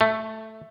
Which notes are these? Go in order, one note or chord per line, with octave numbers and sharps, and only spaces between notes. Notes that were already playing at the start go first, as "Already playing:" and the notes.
A3